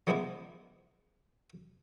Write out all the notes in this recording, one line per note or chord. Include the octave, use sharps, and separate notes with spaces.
F3 G3 G#3 B3 D4 E4